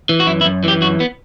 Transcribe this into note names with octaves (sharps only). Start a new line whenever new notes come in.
E3
F#4
F#2 E4
E4
F#2
E3 G4
F#2 F#4
B3